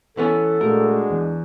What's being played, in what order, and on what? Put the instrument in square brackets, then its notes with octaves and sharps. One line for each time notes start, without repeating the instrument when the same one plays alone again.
[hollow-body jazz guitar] E3 B3 C#4 [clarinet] A4
[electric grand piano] A#2 A3 [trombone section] G#3 D4 F#4 [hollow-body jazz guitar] A#4
[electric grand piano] E2